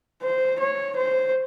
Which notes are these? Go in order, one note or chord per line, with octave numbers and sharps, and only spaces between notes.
C5
C#5
C5